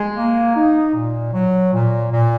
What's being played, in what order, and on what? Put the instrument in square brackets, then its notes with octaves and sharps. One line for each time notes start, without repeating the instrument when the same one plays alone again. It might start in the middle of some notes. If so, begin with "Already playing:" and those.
Already playing: [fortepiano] G#3
[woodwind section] A#3
D#4
A#2
F#3
A#2
A#2